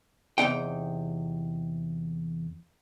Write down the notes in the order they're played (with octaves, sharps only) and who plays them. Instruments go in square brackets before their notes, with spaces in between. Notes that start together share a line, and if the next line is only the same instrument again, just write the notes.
[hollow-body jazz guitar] E2 C3 D#4 G5